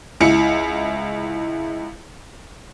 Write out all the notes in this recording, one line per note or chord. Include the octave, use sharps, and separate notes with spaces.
C#2 E4 C#7